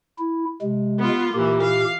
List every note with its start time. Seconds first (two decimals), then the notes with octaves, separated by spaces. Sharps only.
0.19 E4
0.62 C3 G#3
0.99 B3 F4
1.34 A#2 E3 A#3 G4
1.63 F5